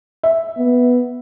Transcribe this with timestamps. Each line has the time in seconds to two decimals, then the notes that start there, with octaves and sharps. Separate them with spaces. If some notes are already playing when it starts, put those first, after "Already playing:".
0.23 E5
0.58 B3